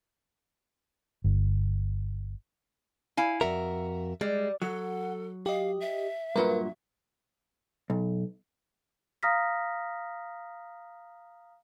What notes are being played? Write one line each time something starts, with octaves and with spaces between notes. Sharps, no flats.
G1
E4 F5 G#5
F2 F#4 A#4 E5
G3 G#3
F#3 A4 F#5
G4 D#5 F5
E5
G2 A#2 F#3 A#4 B4
B1
F5 A#5 D#6 F6 A#6 B6